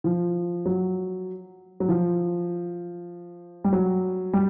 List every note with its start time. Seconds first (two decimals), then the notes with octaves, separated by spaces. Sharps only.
0.04 F3
0.66 F#3
1.80 F#3
1.89 F3
3.64 G3
3.73 F#3
4.33 G3